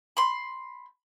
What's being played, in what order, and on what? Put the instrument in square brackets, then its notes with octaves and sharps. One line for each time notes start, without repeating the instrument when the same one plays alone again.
[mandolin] B5 C6